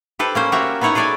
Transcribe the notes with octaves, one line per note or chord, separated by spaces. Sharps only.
G4 A4 B4 C5
A#3 C#4 C5
F#4 G4 A#4 C#5 E5
B3 D#4 E4 C#5 F#5
G#4 A4 C#5 D5 E5 G#5